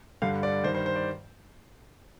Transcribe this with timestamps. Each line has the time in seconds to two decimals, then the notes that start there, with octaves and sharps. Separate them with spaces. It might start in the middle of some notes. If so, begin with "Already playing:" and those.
0.22 G2 D3 G3 F5
0.43 D5
0.64 G2 D#3 G3 C5
0.75 C5
0.86 C5
0.96 D5